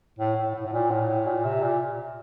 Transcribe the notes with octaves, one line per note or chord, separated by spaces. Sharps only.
A2
A2
A2
A2
A#2
A2
A2
A#2
C3
A#2